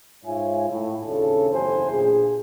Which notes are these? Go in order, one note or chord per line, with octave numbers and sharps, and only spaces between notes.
G#2 F4 C#5 E5 G#5
A2
D#2 C#3 D4 F4 A4 C#5
F#1 E2 A3 G4 C5 G#5
A#2 D4 G#4